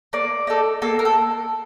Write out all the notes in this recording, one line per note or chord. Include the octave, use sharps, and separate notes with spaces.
A#3 D5
D#4 A4
A#3 A4
A#4
A4